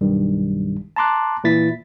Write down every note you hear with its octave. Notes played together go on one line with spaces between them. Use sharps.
B1 G2 D#3 G3
A5 A#5 C6 D6 F#6
A#2 E3 E4 A6 B6